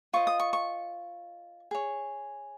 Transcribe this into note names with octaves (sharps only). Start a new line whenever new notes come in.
F4 C5 D#5 C#6
D#6
C#6
C#6
G#4 C#5